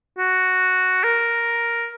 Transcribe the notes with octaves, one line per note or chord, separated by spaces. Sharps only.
F#4
A#4